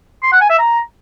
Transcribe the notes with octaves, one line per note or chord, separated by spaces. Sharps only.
C6
F#5
G#5
E5
A#5